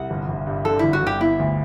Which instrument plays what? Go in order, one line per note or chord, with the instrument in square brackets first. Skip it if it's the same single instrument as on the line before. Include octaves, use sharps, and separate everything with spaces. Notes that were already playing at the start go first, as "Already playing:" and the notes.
Already playing: [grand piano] C2 [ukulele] F#5
[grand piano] G1
G1
G2
[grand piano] D3 [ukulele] A4
[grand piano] G1 [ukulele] E4
[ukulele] F#4
[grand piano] G1 [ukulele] G4
[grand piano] B3 [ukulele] E4
[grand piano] D2